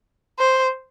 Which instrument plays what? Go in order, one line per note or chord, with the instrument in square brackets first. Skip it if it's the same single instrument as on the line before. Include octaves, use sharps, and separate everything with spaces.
[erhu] C5